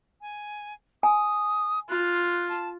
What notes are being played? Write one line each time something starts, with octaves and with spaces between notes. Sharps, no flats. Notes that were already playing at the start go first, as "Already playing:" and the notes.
G#5
G#5 D#6
F4 F#6
A5